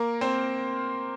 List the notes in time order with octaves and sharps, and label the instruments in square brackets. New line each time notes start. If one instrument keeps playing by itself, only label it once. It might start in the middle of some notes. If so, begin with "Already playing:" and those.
Already playing: [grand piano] A#3 A#4
C4 C5